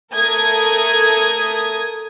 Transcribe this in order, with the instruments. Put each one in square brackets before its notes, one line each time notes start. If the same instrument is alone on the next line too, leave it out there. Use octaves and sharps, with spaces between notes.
[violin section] A3 A4 A#4 D#6 G#6